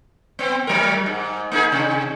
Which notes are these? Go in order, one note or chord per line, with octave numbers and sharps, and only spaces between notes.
B3 C4
F#3 A#4
G#2
A#3 D#4 G#4
C3